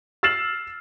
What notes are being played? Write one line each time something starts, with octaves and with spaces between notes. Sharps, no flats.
E6 F6 A6 C7 E7 F#7